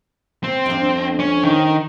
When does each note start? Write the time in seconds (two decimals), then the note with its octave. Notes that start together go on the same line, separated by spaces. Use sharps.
0.44 C4
0.66 F2 D4
1.20 C#4
1.43 D#3